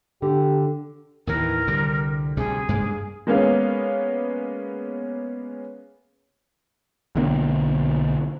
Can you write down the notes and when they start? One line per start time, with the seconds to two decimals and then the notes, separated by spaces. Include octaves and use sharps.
0.22 D3 G4
1.27 D#2 A2 E3 A#4
1.67 C2 D3 G3
2.37 D2 C3 G3 G#4
2.69 G2 G#3 A#3
3.27 G#3 A#3 B3 C#4 F5
7.15 B1 D3 A#3 C4